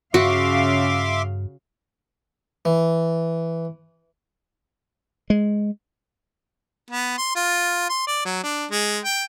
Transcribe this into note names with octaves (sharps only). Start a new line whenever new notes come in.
G2 C#3 F#4 E5 F5 C6 D6
E3
G#3
B3
C6
F4
C6
D5
F#3
D4
G#3
G5